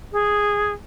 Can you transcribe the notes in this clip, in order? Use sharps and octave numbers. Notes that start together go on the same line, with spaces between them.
G#4